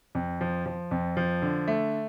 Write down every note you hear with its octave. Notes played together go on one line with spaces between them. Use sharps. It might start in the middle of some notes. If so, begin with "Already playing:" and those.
F2
F3
F3
F2
F3
D3
A3